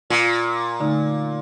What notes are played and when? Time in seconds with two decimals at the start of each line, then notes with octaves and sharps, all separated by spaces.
0.10 A#2 F4
0.80 D3 A3 D#4